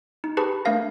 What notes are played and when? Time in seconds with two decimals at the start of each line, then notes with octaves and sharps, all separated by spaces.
0.24 D#4
0.37 G4 G#4 B4 A5 B5 C#6
0.65 A3 D4 A#4 F5 A#6